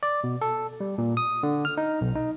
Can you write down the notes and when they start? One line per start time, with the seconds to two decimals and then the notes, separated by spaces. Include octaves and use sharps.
0.03 D5
0.24 B2
0.41 A4
0.80 G3
0.98 A#2
1.17 D#6
1.43 D3
1.65 F6
1.77 D#4
2.01 B1
2.15 D#4